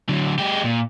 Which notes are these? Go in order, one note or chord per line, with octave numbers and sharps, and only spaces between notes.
D3 F#3
G#3 G4
A#2